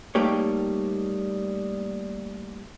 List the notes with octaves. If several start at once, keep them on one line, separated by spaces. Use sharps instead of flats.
G3 A3 A#3 D#4 G4 C#5